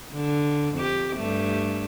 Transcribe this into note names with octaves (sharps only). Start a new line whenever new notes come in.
D3
F2 G4
G2 G3 A3